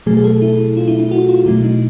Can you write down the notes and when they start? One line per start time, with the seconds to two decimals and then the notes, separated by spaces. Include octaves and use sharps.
0.06 B2 F#3 A3 G#4
0.17 G#4
0.24 A4
0.42 E4
0.77 F4
0.88 E4
1.00 E4
1.11 F#4
1.29 F4
1.46 B2 F#3 A3 E4
1.64 D#4